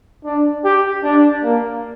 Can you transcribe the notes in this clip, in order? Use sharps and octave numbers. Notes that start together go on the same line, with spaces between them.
D4
G4
D4
A#3